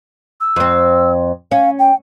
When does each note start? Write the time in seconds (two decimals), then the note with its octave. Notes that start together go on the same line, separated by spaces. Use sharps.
0.41 E6
0.56 F2 C4
1.51 C#4 F5
1.79 G5